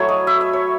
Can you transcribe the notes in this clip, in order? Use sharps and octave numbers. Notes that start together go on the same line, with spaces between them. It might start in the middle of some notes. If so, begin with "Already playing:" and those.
Already playing: F#3 A3 E4 C#5
D#5
E5
E5
C#5